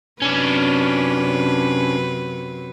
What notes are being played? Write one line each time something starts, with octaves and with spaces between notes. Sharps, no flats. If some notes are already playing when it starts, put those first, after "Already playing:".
F#2 C3 C#4 D4 B4